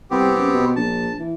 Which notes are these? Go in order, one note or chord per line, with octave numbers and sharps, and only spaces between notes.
C2 B3 C4 G4
F#2
B2
A#1 A5
E3